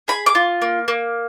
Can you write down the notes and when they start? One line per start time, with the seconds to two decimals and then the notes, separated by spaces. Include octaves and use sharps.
0.08 G#4 B5
0.26 D6
0.35 F4
0.62 A#3
0.88 A#3